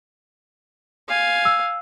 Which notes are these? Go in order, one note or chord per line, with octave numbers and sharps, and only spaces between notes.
F5 G#5
E6